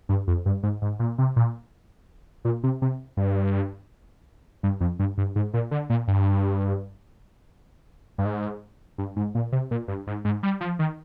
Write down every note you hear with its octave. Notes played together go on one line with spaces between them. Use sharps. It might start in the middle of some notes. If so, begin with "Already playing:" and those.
G2
F2
G2
G#2
G#2
A#2
C3
A#2
A#2
C3
C3
G2
G2
F2
G2
G2
G#2
A#2
D3
A#2
G2
G2
G#2
G2
G#2
A#2
C3
A#2
G2
G#2
G#2
G3
F3
D#3